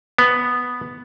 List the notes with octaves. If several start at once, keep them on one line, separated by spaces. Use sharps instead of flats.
B3